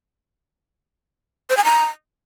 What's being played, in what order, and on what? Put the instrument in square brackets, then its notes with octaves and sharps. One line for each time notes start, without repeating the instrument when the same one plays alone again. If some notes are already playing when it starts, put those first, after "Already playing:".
[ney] C5
G#5
A#5